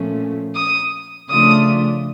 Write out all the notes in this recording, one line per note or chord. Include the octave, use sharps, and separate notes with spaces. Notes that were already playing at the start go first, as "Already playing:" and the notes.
Already playing: A#2 F3 A3 C#4
D#6
C#3 F3 A3 D4 F4 D#6